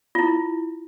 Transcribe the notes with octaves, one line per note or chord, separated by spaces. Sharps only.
E4 F4